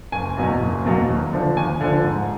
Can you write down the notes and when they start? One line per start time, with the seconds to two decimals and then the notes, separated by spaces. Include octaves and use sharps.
0.12 F#1 G#5
0.37 E2 B2 F#3 A#3
0.60 F#1
0.84 E2 B2 F#3 A#3
1.09 D#2
1.33 D3 F3
1.57 D#2 G#5
1.81 D3 F3
2.04 G#2